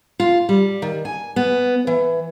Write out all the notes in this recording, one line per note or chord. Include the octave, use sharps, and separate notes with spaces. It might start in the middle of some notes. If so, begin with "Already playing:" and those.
F4
G3
D#3
G#5
B3
E3